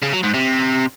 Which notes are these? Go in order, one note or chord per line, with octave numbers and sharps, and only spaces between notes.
C#3
F#3
G#2
C3